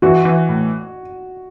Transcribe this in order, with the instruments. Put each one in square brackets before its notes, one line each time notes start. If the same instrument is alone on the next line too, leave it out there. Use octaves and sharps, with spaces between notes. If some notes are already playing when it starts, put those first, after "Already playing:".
[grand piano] E3 [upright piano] F#4
[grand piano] E3
A2